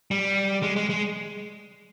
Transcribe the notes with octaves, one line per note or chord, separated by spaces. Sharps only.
G3
G#3
G#3
G#3